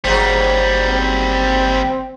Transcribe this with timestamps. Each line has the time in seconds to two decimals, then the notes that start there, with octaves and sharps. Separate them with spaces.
0.05 G1 D#2 F#3 G3 G#4 C5
0.89 C4